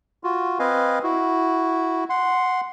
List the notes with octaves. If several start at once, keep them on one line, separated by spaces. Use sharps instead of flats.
F4 F#4
C4 B4 D#5 F5 G#5
E4 F#4
F#5 C6